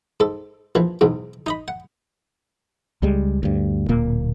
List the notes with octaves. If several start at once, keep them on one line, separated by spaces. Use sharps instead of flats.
G#2 A4
A#1 E3 F3
B1 E2 G#2
D#4 D#5 B5
F#5
C#2 G3 G#3
D2 G2
D1 A#2 A#3